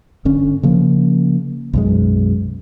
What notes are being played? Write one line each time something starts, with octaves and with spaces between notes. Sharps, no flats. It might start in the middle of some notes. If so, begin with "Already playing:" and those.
G1 D3 C#4
C#3 F3 A#3
B1 F#2 G#3